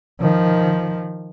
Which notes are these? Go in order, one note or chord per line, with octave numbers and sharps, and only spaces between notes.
D#3 F3